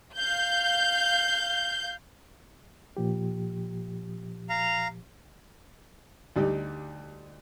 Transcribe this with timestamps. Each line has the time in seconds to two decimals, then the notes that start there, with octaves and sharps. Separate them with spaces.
0.17 F5 G6
2.97 A#2 F3 G4
4.49 F5 A#5
6.36 D2 G3 D#4 G4